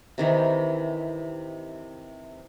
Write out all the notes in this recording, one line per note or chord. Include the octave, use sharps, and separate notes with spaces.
C3 D#3 E3